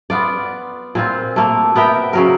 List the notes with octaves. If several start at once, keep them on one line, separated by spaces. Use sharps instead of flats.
B3 F4 D5
A#2 C4 F4
A3 A#3
B3 A#4 E5 G5
C#3 F#3 A#4